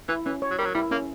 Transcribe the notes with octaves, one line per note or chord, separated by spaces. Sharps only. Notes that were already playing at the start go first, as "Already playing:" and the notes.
E3 E4
E3 C#4
C#5
F#3
G3 A#4
F#3
G3 E4
A#3 C#4